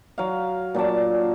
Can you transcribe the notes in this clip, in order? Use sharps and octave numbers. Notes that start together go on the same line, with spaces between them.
F#3 F5
A#2 F#3 D4 A5